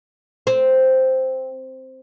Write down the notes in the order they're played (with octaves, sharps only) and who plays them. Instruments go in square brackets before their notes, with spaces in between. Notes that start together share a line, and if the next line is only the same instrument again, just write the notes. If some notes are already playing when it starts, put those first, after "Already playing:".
[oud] C4